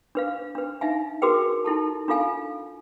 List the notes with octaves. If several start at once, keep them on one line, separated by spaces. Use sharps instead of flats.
D4 B4 F5
D4 B4
D4 D#4 E5 F5 G#5
F#4 G#4 A#4 B4 G5
D#4 E4 A4 A5
D4 F4 A4 F5 G#5